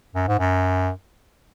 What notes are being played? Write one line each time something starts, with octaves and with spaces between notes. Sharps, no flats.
F#2
G#2
F#2